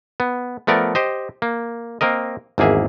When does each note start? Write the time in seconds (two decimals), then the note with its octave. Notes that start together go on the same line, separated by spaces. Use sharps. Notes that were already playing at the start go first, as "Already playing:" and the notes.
0.20 B3
0.67 F3 A3 B3 A#4 D5
0.95 G4 C5 D#5
1.42 A#3
2.01 A#3 C4 A#4 D#5
2.58 G#1 E2 A#3 G#4 E5